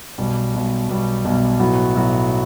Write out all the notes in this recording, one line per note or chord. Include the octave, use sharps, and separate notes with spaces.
B1 B2 G3
B1 B2 G3
B1 B2 G3
B1 B2 G3
B1 A2 F#3 B3 F#4
B1 A2 F#3 B3 F#4